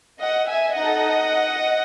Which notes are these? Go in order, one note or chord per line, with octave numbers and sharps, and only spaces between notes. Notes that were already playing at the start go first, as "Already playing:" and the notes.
D#5 F#5
E5 G#5
D#4 A4 D#5 F#5